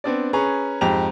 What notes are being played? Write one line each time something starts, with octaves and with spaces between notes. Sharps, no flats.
B3 C4 D4 D5
C#4 G#4 B4 A#5 C#6
F2 G#2 G4 G5 A#5 F7